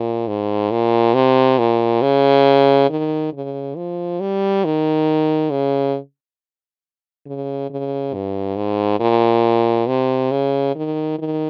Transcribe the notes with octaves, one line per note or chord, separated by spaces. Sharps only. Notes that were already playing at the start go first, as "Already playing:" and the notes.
Already playing: A#2
G#2
A#2
C3
A#2
C#3
D#3
C#3
F3
G3
D#3
C#3
C#3
C#3
G2
G#2
A#2
C3
C#3
D#3
D#3